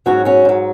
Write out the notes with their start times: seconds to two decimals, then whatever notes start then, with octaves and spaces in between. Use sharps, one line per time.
0.06 G#2 F#3 C#4 F#4
0.25 C#4 F#4
0.45 G#2 F#3